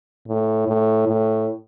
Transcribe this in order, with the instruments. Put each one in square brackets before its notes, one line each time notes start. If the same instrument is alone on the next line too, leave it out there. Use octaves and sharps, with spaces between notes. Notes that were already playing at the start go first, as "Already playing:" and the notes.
[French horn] A2
A2
A2